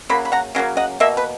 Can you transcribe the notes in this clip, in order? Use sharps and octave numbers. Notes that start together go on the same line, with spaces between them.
C#3 F#3 A#3 B5
B5
F#5 A#5
C#3 F#3 A#3 C#4
D#5 F#5
B2 A#3 E5
B4